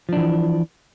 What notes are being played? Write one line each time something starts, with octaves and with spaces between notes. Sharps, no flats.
E3 F3 D4